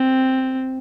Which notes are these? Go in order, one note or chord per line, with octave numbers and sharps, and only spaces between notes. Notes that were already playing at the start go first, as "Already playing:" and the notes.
Already playing: C4